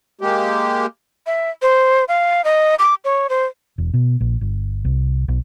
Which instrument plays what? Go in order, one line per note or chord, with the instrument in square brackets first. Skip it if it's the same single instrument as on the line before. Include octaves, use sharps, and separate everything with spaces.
[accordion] G#3 A#3 G4
[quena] E5
C5
F5
D#5
D6
C#5
C5
[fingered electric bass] E1
B2
A#1
G1
C2
B1